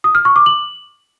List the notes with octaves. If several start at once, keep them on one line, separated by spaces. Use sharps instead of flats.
D#6
F6
C#6
D6
F#7